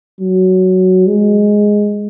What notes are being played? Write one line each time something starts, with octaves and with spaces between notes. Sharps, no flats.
F#3
G#3